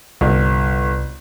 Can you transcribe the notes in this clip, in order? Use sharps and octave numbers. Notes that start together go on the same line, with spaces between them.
G1 C2